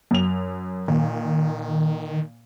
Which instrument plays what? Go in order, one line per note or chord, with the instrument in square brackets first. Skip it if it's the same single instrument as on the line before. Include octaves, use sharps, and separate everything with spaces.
[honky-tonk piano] F#2 F7
[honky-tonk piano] A#2 [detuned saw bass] D#3